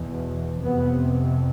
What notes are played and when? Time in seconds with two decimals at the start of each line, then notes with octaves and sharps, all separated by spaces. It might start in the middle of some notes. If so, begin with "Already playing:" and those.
Already playing: E2 B2
0.64 F2 C3 B3